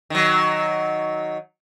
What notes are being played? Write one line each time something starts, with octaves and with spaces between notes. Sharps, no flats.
D#3 F#3